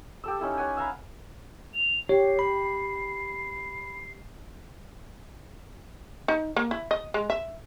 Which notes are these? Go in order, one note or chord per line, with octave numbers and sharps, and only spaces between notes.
G4 A4 E6
C#4 D#4 E4 A4
C#5 F#5 G#5
E5 F5 A#5 B5
F7
G4 C#5 C7
B5
D#4
A#3
E4
D#5
G#3
E5